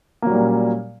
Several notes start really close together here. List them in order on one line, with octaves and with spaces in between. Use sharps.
A#3 F#3 G3 A#2 C#4